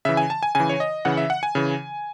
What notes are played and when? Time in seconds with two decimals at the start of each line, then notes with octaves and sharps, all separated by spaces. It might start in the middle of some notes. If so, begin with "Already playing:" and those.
0.05 C#3 E3 E5
0.17 G#5
0.30 A5
0.43 G#5
0.55 C#3 E3 G#5
0.69 C#5
0.80 D#5
1.05 C#3 E3 F#5
1.17 E5
1.30 F#5
1.43 G#5
1.55 C#3 E3